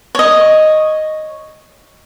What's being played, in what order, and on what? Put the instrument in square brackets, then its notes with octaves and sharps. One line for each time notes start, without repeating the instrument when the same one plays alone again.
[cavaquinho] C#5 D#5